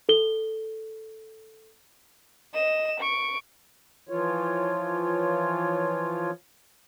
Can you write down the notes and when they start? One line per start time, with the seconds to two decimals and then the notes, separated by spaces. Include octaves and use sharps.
0.09 A4 G7
2.54 D#5 E7
3.00 C#6 D7
4.09 E3 F3 F4 C#5